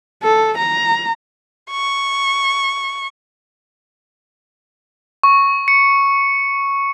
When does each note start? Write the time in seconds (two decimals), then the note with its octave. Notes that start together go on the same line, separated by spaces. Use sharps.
0.23 A4
0.58 A#5
1.70 C#6
5.23 C#6
5.68 C#7